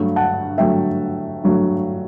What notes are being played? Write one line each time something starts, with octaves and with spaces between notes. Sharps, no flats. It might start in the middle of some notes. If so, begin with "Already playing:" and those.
Already playing: G2 F#3 A3
F#5 A5
G2 F#3 A3 E5 G5
G2 F#3 A3